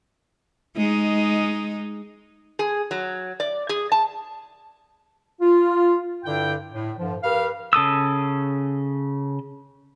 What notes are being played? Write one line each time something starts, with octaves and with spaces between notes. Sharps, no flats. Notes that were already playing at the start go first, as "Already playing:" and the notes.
G#3 D#4
G#4
F#3
D5
G#4
A5
F4
G2 D3 E4 D5 G5
A2
G2 D3 F3
G4 A#4 B4 F5
C#3 A4 D#6 E6